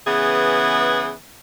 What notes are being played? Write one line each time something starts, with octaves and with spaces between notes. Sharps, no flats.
C#3 E3 B3 G#4